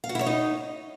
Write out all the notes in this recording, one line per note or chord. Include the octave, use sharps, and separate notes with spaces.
F5
F#4
E4
C#5
D#4